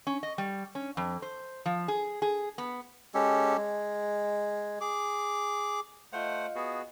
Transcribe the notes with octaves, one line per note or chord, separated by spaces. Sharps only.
C#4
D#5
G3
C#4
F2
C5
F3
G#4
G#4
B3
G#3 C#4 G4 A4
G#3
G#4 D6
A3 F4 C5 D#5 F5 F#5
B3 F#4 G#4